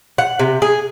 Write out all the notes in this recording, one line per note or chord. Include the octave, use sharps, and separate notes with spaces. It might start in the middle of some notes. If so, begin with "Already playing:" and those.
F#5
C3
G#4